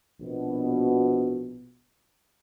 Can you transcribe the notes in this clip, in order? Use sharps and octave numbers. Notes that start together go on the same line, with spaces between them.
A#1 B2